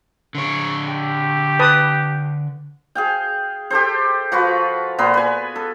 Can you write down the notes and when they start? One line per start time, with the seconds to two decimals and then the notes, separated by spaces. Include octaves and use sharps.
0.35 D3 C#5
0.88 G4
1.60 B4 A5 D#6
2.95 G#4 F5 G5
3.70 G4 A4 C5
4.32 F3 F4 F#4 B4
4.98 A#2 B3 A#4 C6
5.14 B4 G#5
5.56 A4